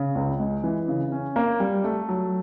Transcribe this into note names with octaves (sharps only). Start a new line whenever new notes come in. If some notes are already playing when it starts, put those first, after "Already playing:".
Already playing: C#3
C#2
G#3
E3
C#3
C#4
A#3
G3
A3
F#3